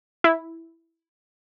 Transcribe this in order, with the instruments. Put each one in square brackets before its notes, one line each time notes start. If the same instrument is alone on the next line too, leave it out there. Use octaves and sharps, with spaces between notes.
[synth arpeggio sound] E4